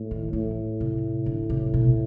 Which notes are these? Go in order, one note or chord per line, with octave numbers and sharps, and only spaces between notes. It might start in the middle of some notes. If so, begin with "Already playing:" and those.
Already playing: A2
D#3
A2 E3
C3
D3
C3
B2